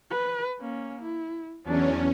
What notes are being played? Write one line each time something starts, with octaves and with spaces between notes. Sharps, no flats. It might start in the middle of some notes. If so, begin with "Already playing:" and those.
B4
A#3 C#4
E4
E2 F#3 C#4 D4